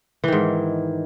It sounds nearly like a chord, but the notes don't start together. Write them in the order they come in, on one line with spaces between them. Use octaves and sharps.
E3 D#3 G#2